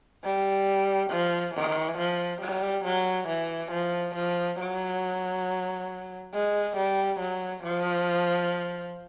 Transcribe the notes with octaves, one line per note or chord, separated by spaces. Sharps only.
G3
F3
E3
F3
G3
F#3
E3
F3
F3
F#3
G#3
G3
F#3
F3